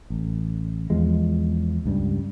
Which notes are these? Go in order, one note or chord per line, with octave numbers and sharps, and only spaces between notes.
A1
E2 F3 G#3
C#2 G2 G3